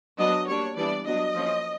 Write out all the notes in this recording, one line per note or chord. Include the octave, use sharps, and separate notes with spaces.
F#3 B3 D4 D#5
G3 A#3 D4 C#5
E3 G3 B3 D4 D5
F#3 B3 D4 D#5
F3 A#3 C#4